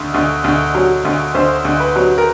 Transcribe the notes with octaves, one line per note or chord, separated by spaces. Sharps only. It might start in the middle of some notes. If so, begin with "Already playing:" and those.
Already playing: D2
D2
D2
F#3
D2
D2 C5
D2
B4
F#3
A#4